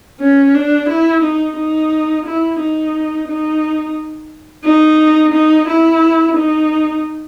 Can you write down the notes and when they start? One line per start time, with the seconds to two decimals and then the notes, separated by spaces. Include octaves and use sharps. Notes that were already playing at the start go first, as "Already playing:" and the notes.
0.20 C#4
0.54 D4
0.89 E4
1.23 D#4
1.57 D#4
2.26 E4
2.60 D#4
3.28 D#4
4.65 D#4
5.34 D#4
5.68 E4
6.37 D#4